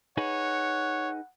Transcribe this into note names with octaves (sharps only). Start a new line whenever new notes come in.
D#4 G#4 B4 C#5 F#5